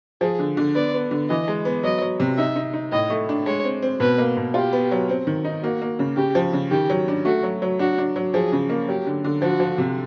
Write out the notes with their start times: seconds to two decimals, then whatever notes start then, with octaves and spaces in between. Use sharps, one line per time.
0.21 F3 G#4
0.39 D3
0.57 D3
0.75 B3 D5
0.94 B3
1.11 D3
1.29 E3 D#5
1.48 G#3
1.65 B3
1.83 F#3 D#5
2.01 F#3
2.20 C3
2.38 D#4 E5
2.56 D#4
2.74 D#4
2.92 A2 D#5
3.10 A3
3.29 D4
3.46 G#3 C#5
3.64 C4
3.82 C4
4.00 B2 B4
4.18 A#3
4.37 B2
4.54 F4 G4
4.73 B3
4.91 F#3
5.09 C4
5.27 D#3
5.44 D#4
5.63 A#3 F#4
5.82 A#3
5.99 C#3
6.17 C#3 G4
6.35 F3
6.53 C#3
6.71 D#3 G4
6.90 F#3
7.08 D4
7.25 A3 F#4
7.43 F#3
7.62 F#3
7.79 D4 F#4
7.98 D4
8.16 F#3
8.34 F3 G#4
8.52 C#3
8.69 A#3
8.88 F#3 G4
9.07 D3
9.24 D3
9.42 F3 F#4
9.60 F3
9.78 C3